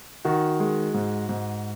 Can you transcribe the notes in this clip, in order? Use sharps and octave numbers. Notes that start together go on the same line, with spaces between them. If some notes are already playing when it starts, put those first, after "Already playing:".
D#3 F#4
G#3
G#2
G#2